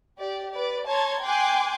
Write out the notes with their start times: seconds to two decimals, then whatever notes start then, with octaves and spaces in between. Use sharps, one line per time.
0.18 G4 D5
0.51 B4 D5
0.87 C#5 A5 A#5 C6 G#6
1.23 G5 G#5 C6 D6 F#6